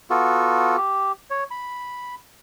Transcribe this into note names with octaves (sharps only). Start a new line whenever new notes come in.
B3 F4 F#4 A4
G4
C#5
B5